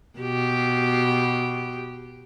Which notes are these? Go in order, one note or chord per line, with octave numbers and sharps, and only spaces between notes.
B2 G4